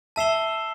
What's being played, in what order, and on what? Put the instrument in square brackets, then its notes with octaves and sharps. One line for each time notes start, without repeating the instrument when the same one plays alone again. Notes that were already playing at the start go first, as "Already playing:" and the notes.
[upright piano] E5 [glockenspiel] A5 E6 C7 E7 G7